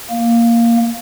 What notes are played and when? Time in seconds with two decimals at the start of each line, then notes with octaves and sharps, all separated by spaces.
0.11 A#3